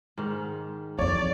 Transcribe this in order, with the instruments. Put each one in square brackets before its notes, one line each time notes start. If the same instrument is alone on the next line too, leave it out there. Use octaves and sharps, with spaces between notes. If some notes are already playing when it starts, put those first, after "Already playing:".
[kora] G#2 D#3
[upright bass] F2 E3 [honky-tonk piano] C#5 [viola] D5